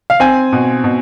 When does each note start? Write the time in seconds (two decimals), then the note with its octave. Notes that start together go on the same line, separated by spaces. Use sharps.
0.10 F5
0.20 C4 G#5
0.53 B2
0.84 B2